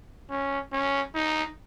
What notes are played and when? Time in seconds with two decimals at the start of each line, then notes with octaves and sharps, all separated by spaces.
0.30 C#4
0.73 C#4
1.15 D#4